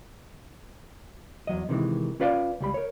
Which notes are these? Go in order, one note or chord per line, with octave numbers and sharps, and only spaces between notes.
E2 F#3 D#5
C3 D#3 E3 G#3
C#4 F4 B4 D5 F5
C#2 G3 B5
A#4 C#5